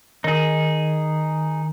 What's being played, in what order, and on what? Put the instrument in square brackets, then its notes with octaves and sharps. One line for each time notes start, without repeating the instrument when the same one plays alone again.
[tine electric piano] D#3 [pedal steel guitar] D#4 G#4